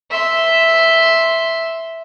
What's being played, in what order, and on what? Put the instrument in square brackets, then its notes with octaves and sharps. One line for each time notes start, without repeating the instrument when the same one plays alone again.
[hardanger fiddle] E5 C6